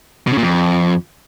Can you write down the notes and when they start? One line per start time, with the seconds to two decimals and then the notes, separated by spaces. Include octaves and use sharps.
0.27 B2
0.32 C#3
0.38 A#2
0.43 F2